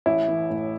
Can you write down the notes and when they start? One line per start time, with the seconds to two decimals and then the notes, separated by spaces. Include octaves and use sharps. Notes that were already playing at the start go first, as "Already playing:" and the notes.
0.06 A1 E4
0.28 E3
0.50 A2